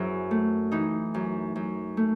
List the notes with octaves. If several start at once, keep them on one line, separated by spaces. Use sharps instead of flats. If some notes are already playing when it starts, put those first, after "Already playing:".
Already playing: F#2 E4 F#4 G#4 C5
A3
E3 D#4
F#2
F#2
A3